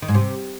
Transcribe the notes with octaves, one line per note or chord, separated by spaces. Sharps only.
D#3
G#2
C3